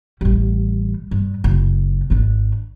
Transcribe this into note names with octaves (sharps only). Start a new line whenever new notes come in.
A1 G3
G2
F#1
G#1 D4